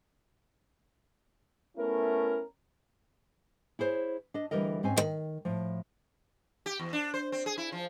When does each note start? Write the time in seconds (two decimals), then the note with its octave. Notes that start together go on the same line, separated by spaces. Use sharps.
1.77 A3 B3 C#4 E4 A#4
3.79 E4 G#4 C5 C#5
4.34 D4 D#5
4.51 D2 B2 E3 G3 A#4 D#5
4.83 G#2 C4 C#4 C5 G#5
4.96 D2 D#3
5.45 A2 F3
6.66 G4
6.79 E2
6.93 D4
7.14 C5
7.32 C4
7.46 G#4
7.58 E4
7.72 F3